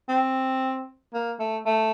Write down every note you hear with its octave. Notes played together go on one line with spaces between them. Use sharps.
C4
A#3
A3
A3